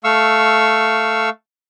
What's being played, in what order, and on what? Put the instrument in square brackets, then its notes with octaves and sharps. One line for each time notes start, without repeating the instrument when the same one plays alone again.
[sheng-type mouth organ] A3 F5 C#6 E6